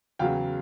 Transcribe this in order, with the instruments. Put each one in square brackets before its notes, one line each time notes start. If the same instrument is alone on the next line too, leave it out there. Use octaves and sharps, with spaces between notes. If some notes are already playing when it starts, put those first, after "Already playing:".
[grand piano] E2 C#3 F#3 F5 G5